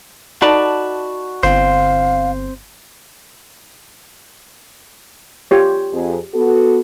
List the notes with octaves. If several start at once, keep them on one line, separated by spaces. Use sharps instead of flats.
D#4 F#4 A4 D5 A5 B5
G1 C4 C5 F5
F4 G4 C#5
F2 G#4
B3 F#4 A4